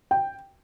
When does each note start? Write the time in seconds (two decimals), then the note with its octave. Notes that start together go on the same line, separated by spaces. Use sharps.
0.11 G5